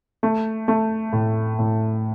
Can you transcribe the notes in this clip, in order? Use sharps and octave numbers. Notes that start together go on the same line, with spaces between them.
A3
A3
A2
A2